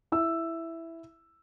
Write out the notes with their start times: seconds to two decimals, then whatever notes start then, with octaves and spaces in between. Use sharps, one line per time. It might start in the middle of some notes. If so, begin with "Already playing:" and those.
0.12 E4 E6